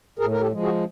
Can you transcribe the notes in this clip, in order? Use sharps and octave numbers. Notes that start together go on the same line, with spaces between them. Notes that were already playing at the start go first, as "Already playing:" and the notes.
A2 G#4 A#4
A#4
G4 A4
F3 G#3
F#4 G#4